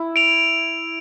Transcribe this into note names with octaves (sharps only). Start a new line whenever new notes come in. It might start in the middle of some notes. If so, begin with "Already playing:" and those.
Already playing: E4
D7 F7